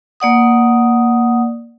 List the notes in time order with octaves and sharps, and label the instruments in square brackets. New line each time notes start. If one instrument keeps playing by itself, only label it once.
[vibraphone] A#3 D5 F#5 D#6